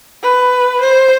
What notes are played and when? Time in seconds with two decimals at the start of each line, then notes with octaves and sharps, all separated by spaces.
0.23 B4
0.81 C5